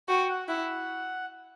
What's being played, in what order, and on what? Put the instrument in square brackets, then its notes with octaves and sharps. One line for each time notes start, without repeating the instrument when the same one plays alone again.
[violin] F#4 [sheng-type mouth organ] G5
[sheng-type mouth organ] F#5
[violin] E4 [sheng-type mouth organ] F#5